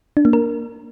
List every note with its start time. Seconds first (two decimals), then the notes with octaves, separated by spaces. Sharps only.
0.17 D4
0.25 A#3
0.33 A#4